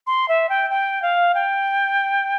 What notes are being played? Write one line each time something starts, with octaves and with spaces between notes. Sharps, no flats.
C6
E5
G5
G5
F5
G5